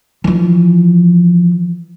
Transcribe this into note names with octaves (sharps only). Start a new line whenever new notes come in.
E3 F3